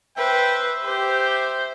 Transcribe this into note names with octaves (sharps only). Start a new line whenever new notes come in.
B4 C5 E5 G5
G4 C5